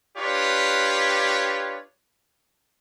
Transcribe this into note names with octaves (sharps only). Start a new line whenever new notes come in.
D4 F4 G4 B4 C#5